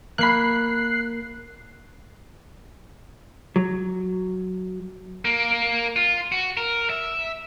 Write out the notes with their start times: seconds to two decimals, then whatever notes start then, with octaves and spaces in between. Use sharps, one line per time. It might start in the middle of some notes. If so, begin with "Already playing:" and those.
0.18 A#3 B5 F#6 C7
3.56 F#3
5.25 A#3
5.96 F4
6.32 F#4
6.57 A#4
6.90 E5